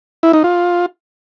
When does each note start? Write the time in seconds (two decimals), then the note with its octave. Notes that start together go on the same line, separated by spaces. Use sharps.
0.23 E4
0.33 D#4
0.44 F4